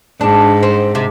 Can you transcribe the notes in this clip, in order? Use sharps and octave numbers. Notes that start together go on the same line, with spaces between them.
G#2 D4
C4
C3